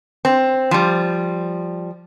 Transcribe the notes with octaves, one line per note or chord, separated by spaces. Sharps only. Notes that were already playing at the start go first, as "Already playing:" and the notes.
C4
F3 G3